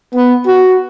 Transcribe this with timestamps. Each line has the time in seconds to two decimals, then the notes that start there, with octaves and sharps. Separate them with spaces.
0.14 B3
0.46 F#4